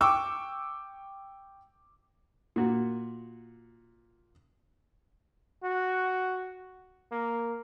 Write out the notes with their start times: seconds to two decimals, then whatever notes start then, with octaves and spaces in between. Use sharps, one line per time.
0.01 G5 C#6 D6 E6
2.56 A#2 F#4
5.63 F#4
7.12 A#3